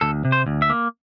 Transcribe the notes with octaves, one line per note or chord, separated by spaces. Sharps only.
D2 A4
C3
C5
D2
E5
A#3